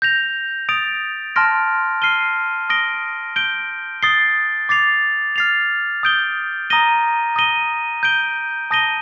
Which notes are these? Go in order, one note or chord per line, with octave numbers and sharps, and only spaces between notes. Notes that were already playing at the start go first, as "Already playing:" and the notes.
G6 A#6 F7
D#6 A6 D7 F7
A5 C6 F6 A#6 D7
F6 C7 D#7 G7
D#6 A#6 D7 G7
G6 D7 G7
D#6 A6 C7 G7
D6 A6 C7 F7
F6 A6 C7 F7
D#6 G6 D7 G7
A#5 D#6 A#6 D#7 G7
D#6 A#6 D#7 G7
G6 D7 G7
A5 D#6 A#6 D#7 G7